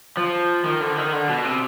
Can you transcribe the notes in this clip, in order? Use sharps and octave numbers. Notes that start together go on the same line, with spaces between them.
F3
D#3
D3
D#3
D3
B2
C3